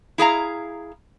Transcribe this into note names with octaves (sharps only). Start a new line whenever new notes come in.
E4 G#4 F5 A#5